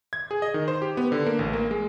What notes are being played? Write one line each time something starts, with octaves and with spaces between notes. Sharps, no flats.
G#6
G#4
D#5
D#3
C5
G4
B3
D3
A#3
A1
A#3
G#3